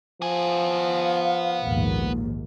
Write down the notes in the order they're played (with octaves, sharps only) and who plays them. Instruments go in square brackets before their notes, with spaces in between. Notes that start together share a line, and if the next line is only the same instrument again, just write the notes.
[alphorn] F3 [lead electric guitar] B3 G#5
[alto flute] F5
[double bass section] A#1 D#2 G#2